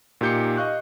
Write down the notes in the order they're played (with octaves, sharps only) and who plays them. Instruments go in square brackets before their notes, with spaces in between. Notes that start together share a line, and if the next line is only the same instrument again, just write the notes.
[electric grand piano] A#2 D#4 G4 G6 C7 C#7
D#5 F5 C#6 F#6